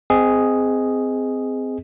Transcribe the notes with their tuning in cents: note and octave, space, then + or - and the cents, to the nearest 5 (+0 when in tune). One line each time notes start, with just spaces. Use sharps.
C4 -20 G#4 +0 D#5 +0